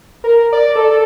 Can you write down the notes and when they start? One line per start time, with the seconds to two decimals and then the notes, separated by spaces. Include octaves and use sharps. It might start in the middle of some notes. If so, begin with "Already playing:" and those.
0.24 A#4
0.53 D5
0.76 A4
0.91 A4